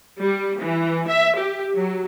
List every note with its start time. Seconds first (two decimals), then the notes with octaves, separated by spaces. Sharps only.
0.21 G3
0.61 E3
1.08 E5
1.39 G4
1.75 F#3